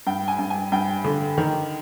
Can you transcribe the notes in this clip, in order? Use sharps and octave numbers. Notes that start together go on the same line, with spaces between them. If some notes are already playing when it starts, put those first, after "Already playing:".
G2 G5
G#5
G2
G#5
G2 G5
D3
D#3